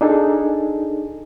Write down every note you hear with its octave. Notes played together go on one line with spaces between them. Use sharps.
D4 D#4 G#4 A4